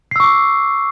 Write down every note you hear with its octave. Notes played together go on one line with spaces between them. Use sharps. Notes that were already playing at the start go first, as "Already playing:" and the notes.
C#6 D6 E6 C7